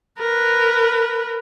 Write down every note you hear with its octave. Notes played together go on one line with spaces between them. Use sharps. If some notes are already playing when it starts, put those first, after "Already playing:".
A#4 B4